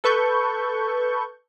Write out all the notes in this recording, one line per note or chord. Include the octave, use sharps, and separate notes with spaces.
A4 B4 C#6 G6